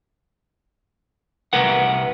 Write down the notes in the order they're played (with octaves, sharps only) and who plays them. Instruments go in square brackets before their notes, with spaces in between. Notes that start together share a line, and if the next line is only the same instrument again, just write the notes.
[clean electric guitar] C2 A#4 B4 F#5